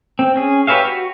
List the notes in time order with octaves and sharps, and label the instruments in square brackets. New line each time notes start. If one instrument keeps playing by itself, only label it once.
[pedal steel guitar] C4
C#4 G#4
G4 B4 C#5 E5 F5
F#4